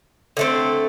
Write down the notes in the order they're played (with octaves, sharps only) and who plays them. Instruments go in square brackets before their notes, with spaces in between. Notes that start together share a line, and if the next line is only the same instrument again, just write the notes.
[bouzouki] D3 A3 C4